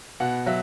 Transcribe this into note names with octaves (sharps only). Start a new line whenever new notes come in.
B2 F#5
F#3 E5